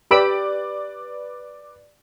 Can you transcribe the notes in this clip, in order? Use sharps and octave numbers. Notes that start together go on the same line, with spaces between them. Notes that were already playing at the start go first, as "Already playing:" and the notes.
G4 B4 D5 B5 E6 D7